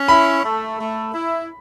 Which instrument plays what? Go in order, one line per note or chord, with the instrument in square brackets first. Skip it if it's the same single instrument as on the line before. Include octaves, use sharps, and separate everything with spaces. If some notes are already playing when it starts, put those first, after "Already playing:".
Already playing: [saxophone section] C#4
[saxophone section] E4 [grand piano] B5
[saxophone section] A3
A3
E4